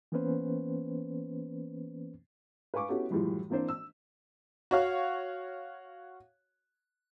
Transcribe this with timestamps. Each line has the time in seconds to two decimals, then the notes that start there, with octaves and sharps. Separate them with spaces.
0.12 E3 A#3 B3 C#4 B4 C5
2.74 B4 F5 G#5 C#6 D6
2.89 B3 C#4 E4 F#4 G4 A4
3.10 F#2 A2 E3 F3 G3 G#3
3.50 E3 A#3 C4 D4 C5
3.69 E6
4.71 F#4 C#5 F5